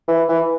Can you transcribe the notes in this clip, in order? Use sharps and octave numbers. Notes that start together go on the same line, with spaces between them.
E3
E3